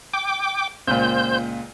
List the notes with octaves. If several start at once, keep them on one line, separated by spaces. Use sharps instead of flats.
G5 D6
C#2 A#2 C5 G6